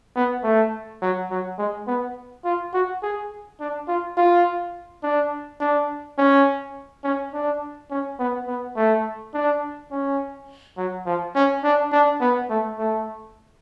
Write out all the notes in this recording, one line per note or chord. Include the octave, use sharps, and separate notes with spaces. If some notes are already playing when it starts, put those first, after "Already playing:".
B3
A3
F#3
F#3
G#3
B3
F4
F#4
G#4
D4
F4
F4
D4
D4
C#4
C#4
D4
C#4
B3
B3
A3
D4
C#4
F#3
F3
C#4
D4
D4
B3
A3
A3